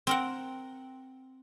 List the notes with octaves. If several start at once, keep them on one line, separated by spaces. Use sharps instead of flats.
C4 A#4 F#5